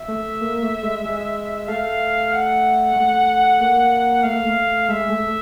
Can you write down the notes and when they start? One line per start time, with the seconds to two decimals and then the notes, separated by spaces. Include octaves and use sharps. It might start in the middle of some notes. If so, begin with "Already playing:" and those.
Already playing: E5
0.08 A3
0.41 A#3
0.62 A3
0.83 G#3
1.05 G#3
1.68 A3 F5
2.32 F#5
2.96 A3
3.60 A#3
4.23 A3 F5
4.35 A#3
4.45 A3
4.88 G#3 E5
5.09 A3